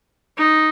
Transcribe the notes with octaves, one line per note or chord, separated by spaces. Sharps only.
D#4